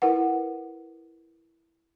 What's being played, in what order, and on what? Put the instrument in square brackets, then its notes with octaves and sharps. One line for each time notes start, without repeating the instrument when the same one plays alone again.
[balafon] E4 A#4 B4 F#5